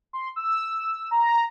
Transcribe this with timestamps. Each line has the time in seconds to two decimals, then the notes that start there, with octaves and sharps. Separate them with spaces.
0.13 C6
0.36 E6
1.11 A#5